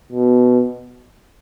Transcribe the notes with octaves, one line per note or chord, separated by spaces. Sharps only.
B2